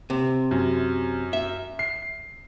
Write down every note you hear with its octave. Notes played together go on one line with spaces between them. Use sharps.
C3
F#2
E5
C7